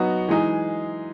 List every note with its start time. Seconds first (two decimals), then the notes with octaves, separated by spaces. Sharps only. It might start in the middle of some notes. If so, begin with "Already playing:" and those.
Already playing: F#3 B3 D#4 F#4
0.29 E3 G#3 D#4 G#4